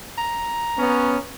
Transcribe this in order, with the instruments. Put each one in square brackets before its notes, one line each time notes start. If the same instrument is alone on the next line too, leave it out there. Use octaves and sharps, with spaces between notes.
[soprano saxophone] A#5
[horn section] B3 C#4